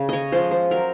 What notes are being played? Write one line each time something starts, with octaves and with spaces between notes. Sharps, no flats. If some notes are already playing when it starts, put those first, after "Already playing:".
Already playing: C#3
C#5 D#5
F3 G#3 C#4 C5
C5
F#3 A#4